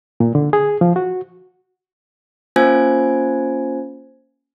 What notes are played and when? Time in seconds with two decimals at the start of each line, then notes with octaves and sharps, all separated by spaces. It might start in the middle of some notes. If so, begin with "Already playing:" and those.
0.20 A#2
0.35 D3
0.53 G#4
0.81 F3
0.96 F#4
2.56 A#3 C#4 F4 C5 G#5 G#6